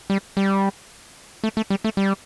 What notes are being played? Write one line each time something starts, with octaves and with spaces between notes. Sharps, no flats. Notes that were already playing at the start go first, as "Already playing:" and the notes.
G3
G3
A3
A3
G3
A3
G3